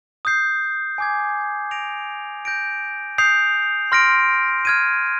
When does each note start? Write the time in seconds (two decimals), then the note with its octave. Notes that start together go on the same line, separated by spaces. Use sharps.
0.25 D#6 G6 C7
0.98 G#5 D6 G#6
1.71 G6 A#6 D7 F7
2.45 G6 A#6 D7
3.18 D#6 G6 C7 F7
3.92 C6 F6 A#6 D7
4.65 F6 G#6 D#7